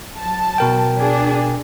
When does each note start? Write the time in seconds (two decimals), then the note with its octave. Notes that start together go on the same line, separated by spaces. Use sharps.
0.18 F#3 A5
0.58 B2 A#4 G5
0.96 D4 G#4